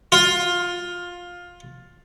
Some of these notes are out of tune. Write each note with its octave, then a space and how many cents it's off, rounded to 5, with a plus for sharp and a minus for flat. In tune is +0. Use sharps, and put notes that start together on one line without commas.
F4 +15